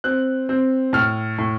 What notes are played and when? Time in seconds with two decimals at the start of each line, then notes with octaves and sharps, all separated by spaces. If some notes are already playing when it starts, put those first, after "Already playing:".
0.04 C4 F#6
0.49 C4
0.93 A2 F6
1.38 A2